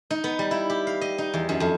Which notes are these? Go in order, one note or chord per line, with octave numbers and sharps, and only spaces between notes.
D#4
B3
G3
E4
G4
F5
D#5
D#4
E2
F#2
F2